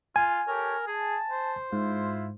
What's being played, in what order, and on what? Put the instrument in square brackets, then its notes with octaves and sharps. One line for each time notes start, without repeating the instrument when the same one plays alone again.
[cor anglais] F4 [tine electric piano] G#5
[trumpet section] G4 A4 C#5 [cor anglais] A#4
[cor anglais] G#4 [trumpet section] A5
[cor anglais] C5
[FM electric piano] G#2 [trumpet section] E4 F4